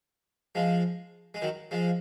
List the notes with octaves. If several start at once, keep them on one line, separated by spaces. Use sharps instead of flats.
F3 G#3
G#3
D#3 F#3
F3 G#3